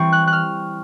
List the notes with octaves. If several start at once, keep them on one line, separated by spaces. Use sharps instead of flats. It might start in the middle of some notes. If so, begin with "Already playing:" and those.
Already playing: E3 G3 C4 C#6
F#6
F#6
F6